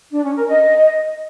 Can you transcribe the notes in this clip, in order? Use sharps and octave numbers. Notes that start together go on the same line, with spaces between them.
D4
C#4
A#4
D#5